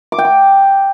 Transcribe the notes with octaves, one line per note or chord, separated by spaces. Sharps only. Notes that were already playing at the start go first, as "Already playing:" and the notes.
D6
G5
D6